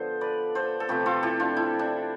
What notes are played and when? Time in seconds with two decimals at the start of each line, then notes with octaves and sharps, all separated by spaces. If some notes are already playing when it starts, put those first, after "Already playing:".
Already playing: D3 F3 B3 A4 C5
0.21 B4 D5
0.55 A4 C5
0.80 A4
0.88 C3 F3 A3 G4 B4
1.06 F4 A4
1.23 E4 G4
1.40 D4 F4
1.57 E4
1.79 D4